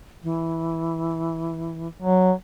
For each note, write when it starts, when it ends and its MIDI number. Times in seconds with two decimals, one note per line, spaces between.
0.23 1.88 52
2.02 2.33 54